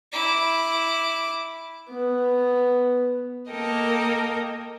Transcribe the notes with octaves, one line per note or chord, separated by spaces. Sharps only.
E4 D6
B3
A#3 A4 A#4 D#5 G5